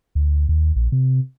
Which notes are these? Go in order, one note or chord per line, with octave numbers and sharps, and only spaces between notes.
D2
D#2
A#1
C3